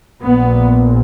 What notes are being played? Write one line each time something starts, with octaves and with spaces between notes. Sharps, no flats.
A#1 A#2 B3